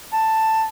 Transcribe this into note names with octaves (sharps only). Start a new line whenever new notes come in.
A5